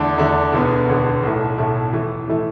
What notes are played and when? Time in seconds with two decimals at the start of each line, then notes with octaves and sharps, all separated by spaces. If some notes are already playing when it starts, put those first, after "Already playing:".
Already playing: E2 D3 A3 D4
0.18 E2 D3 A3 D4
0.53 E1 D2 D3 B3
0.89 E1 D2 D3 B3
1.23 B1 A2 A3
1.58 B1 A2 A3
1.93 A2 E3 A3
2.28 A2 E3 A3